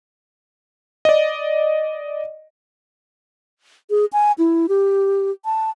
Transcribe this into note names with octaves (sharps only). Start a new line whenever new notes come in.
D5 D#5
G#4
G#5
E4
G4
A5